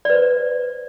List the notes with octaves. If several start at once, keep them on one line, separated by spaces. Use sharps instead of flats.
B4 C5 D5